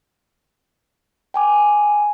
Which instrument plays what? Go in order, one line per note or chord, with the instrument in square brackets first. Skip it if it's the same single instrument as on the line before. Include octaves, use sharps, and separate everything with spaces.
[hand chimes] G5 G#5 D6